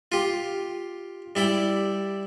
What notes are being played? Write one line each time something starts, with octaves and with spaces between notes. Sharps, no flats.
F4 G4
G3 E4 D5 G5